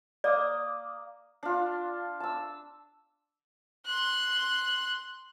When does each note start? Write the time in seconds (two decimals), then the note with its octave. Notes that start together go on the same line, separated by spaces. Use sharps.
0.24 A#3 D5 D#6
1.43 D4 F4
2.20 A5 E6
3.86 C6 F#6